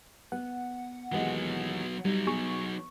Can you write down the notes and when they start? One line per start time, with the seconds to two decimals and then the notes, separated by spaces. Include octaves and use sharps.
0.32 B3 F#5
1.12 D#2 E3 F#3 G#3 B3
2.05 F#3 G3 D#4
2.27 B3 G#4 C#6